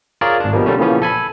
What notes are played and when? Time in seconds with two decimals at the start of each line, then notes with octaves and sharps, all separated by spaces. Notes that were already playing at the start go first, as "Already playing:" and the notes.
0.21 F4 G#4 A#4 C#5 D5
0.40 G#1 D4
0.53 B2 F3 G3 A#3
0.66 D3 G3 A3 C#4
0.79 A#2 C#3 E3 F3 B3 C#4
1.02 A4 G#5 B5